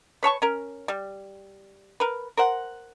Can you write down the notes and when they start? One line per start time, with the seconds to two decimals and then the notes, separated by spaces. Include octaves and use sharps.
0.23 B4 C#5 A5 C#6
0.42 C#4 A#4
0.88 G3
2.00 A#4 B4
2.37 A#4 C5 F#5